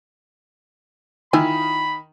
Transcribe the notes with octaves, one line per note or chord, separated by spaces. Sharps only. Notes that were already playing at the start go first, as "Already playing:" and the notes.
D#3 E4 F4 G#5 B5